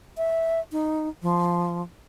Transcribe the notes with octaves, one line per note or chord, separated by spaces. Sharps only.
E5
D#4
F3